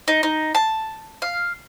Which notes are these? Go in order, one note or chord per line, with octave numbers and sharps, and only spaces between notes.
D#4
D#4
A5
F5